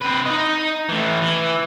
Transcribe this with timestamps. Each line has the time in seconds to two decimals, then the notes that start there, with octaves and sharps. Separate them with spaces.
0.02 C4 B4
0.26 D#4 D#5
0.89 A2 E3
1.21 E3